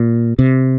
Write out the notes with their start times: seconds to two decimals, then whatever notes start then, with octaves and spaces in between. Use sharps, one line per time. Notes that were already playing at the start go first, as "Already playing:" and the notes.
Already playing: A#2
0.39 C3